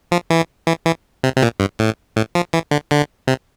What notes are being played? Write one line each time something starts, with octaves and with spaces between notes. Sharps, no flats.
F3
E3
E3
E3
C3
C3
A#2
G2
A2
A2
F3
E3
D3
D3
C3